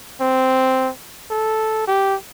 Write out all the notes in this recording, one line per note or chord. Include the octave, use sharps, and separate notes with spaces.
C4
A4
G4